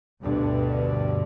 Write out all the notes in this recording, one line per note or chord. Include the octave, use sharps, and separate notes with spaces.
D2 G2 B2 D3